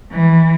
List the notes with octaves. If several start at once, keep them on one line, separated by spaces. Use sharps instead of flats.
E3